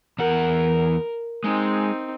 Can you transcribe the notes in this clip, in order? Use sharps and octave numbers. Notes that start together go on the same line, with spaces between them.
E2 A#4 F#5
G#3 C4 D#4